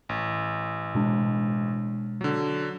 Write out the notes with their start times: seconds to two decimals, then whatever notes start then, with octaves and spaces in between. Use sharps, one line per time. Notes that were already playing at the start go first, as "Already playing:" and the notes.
0.09 A1
0.95 B2 G#3 D4
2.21 D3 F#3